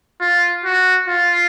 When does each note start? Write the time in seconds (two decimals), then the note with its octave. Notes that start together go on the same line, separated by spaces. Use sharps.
0.21 F4
0.65 F#4
1.08 F4